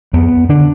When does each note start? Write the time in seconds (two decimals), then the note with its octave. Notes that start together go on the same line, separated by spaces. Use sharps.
0.13 F2 B3
0.49 D3 D4